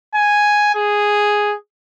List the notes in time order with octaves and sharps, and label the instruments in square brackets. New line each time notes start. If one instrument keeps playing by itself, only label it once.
[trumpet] G#5
G#4